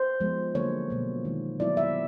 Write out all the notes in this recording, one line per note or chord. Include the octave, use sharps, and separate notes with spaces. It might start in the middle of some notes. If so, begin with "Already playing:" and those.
Already playing: C5
F3 G#3 B3
D3 F#3 A#3 C#5
B2 F#3 A#3
D#3 G#3 C4
F#3 B3 E4 D5
E5